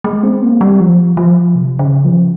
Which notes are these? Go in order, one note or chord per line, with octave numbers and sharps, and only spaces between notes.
G#3
C4
A#3
G3
F3
F3
C3
C#3
F3